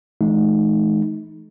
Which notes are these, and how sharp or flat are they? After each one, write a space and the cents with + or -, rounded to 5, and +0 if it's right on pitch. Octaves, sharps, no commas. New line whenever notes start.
E3 +0 A3 -45 D#4 +0